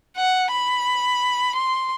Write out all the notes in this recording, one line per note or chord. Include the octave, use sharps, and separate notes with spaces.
F#5
B5
C6